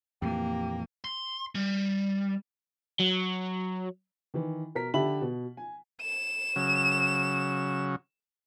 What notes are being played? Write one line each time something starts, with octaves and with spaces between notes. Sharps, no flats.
F2 A#2 E3 A#3 G4
C6
G3
F#3
D#3 E3
B2 A#4 B6
D3 G4 E5 A5 B5 F#7
B2
G#5
E7
C#3 F#3